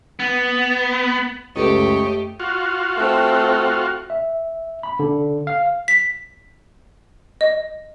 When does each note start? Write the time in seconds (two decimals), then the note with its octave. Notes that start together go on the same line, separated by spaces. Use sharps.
0.20 B3
1.56 C#2 F#2 A3 G4 A4 B4 C#5 D#5
2.40 F4 F#4
2.96 A3 C4
4.10 E5
4.83 B5
4.99 D3
5.47 F5
5.88 B6
7.41 D#5